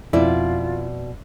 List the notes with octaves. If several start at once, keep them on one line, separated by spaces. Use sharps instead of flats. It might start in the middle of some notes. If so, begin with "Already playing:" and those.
F2 B2 E4 F4 D5